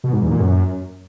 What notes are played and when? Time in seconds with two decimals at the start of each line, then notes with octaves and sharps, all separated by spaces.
0.04 B2
0.13 G#2
0.22 E2
0.31 A#2
0.40 F#2